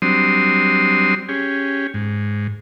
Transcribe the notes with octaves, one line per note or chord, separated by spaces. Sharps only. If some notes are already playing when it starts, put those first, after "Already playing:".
F#3 G3 C4 D4 C6 D#6
C#4 G4 G#4
G#2